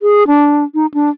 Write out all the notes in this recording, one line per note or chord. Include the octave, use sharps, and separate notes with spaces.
G#4
D4
D#4
D4